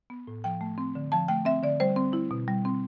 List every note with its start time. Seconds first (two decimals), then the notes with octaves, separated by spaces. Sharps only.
0.10 B3
0.27 A2
0.44 F3 G5
0.61 A3
0.78 C4
0.95 D3
1.12 F3 A5
1.28 A3 G5
1.45 C4 E5
1.63 D3 D5
1.80 G3 C5
1.96 C4
2.13 E4
2.31 B2
2.48 G3
2.65 C4